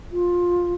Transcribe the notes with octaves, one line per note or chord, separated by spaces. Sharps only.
F4